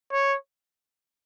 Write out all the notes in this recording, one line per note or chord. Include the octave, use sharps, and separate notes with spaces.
C#5